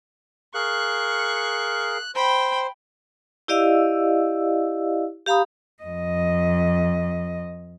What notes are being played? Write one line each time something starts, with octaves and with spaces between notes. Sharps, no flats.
G#4 A#4 F5 C#6 F#6
C5 G5 B5
E4 G4 D5 D#5 F5 E6
G4 F5 A#5 B5 D#6
F2 D#5